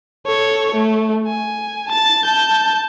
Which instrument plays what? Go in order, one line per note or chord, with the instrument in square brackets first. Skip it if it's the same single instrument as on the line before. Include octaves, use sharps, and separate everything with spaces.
[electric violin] A4 C#5
A3
G#5
A5 A6
A5 G6